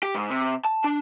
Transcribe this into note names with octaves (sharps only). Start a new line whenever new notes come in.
G4
G#2
C3
A5
D4